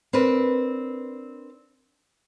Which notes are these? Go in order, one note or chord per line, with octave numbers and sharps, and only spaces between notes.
C4 D4 A#4 B4